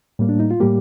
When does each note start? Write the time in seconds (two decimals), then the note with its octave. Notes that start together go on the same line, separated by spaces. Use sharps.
0.19 A2 G3 A#3
0.29 D4
0.40 D#4
0.51 F4
0.60 A2 G3 A#3 G4